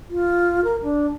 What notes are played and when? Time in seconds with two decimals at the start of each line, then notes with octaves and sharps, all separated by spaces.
0.10 F4
0.64 A#4
0.83 D4